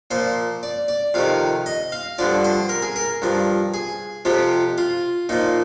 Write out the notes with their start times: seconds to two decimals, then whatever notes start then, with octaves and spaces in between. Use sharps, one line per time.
0.11 A#2 F3 C5
0.63 D5
0.88 D5
1.14 F2 C3 D#3 F5
1.66 D#5
1.92 F5
2.18 G2 D3 F3 D5
2.44 C5
2.69 A#4
2.82 G#4
2.96 A#4
3.22 G2 F3
3.74 G#4
4.25 F2 C3 F3 G4
4.78 F4
5.29 A#2 F3 D#4